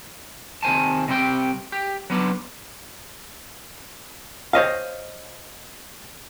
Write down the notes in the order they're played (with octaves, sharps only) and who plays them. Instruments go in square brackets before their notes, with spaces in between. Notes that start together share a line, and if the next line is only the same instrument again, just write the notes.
[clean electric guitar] C3 D#3 C5 G#5 A5
C3 G3 C4 G5
G4
F#3 B3 D4
[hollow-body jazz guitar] C5 C#5 D#5 F5